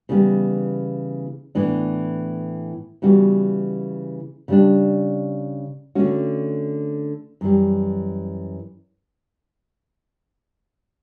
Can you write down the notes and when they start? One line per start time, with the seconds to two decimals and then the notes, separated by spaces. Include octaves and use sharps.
0.09 C#3 E3 G3 B3
1.55 A2 E3 B3 D4
3.02 C#3 E3 G3 B3 F#4
4.48 C#3 G3 D4
5.95 D3 A3 C#4 F#4
7.41 F#2 E3 G3